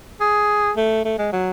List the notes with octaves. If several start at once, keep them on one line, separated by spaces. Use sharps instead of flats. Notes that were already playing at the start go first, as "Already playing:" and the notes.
G#4
A3
A3
G#3
F#3